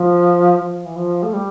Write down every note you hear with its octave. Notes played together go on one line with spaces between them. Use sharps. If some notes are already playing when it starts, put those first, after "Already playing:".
Already playing: F3
F3
E3
F3
A3
G3